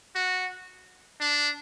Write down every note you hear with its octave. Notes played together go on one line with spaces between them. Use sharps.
F#4
D4